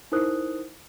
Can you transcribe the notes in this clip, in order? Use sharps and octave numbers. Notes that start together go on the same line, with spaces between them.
D#4 E4 A#4 C5 D#6 F#6